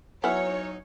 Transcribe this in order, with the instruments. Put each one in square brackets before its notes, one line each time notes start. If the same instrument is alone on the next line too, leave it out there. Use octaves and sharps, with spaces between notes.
[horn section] F#3 D#4 [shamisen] B3 E4 F#5 [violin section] C#5 [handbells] G#5 F6